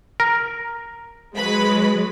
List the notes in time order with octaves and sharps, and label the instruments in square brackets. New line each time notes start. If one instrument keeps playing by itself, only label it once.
[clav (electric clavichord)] A#4
[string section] F#3 G#3 [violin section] B4 B5